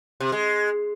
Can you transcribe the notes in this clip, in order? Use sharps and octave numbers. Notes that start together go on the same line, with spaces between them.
C3
G#3